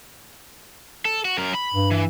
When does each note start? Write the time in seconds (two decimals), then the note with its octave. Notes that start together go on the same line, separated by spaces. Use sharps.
1.05 A4
1.25 F#4
1.38 F#2 A#4
1.55 B5
1.74 G2
1.91 E3